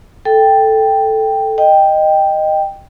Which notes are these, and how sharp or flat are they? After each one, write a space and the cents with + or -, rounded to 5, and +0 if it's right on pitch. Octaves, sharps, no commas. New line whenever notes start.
A4 +0 G5 +0
D#5 -10 G5 +0